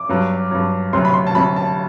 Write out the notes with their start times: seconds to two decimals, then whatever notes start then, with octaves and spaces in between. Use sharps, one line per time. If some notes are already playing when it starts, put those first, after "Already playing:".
Already playing: D6
0.09 G2 F#3
0.51 G2 F#3
0.93 D2 C3 F#3 C6
1.05 B5
1.14 C6
1.27 A5
1.35 D2 C3 F#3 B5
1.56 A5